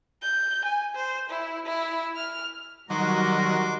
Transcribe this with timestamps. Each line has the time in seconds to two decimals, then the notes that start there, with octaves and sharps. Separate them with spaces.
0.22 G6
0.65 G#5
0.95 C5
1.30 E4
1.66 E4
2.16 F6
2.90 D#3 F#3 G3 F#4 A#4 C6 D6